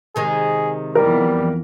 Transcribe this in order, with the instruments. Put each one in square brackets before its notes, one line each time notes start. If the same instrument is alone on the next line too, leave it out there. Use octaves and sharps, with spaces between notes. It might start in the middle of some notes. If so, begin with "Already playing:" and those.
[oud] C3 D#3 G#3 [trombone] G#4
[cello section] F2 E3 B3 [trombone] G3 [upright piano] A#4